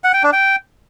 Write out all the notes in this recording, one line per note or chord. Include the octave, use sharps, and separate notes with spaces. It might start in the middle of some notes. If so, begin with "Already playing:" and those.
F#5
G5
D4
G5